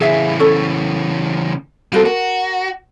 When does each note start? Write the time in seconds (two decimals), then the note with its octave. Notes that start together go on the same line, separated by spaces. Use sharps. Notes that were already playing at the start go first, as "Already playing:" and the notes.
0.01 C#3 E3 G#4 E5 F5
0.40 C#4 A4 C#5
1.92 G3 C4 F4 F#4 A4
2.06 F#4 A#4